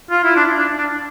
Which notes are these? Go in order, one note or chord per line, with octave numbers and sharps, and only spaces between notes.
F4
E4
D4
D4
D4